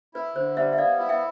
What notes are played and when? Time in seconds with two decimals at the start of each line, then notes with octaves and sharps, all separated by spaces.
0.14 E4 B4
0.36 D3 C5
0.57 G3 C5 E5
0.73 E5
0.78 B3 D5 F5
0.99 E4
1.09 E5 G5